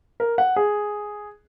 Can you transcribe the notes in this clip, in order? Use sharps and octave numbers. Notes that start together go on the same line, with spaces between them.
A#4
F#5
G#4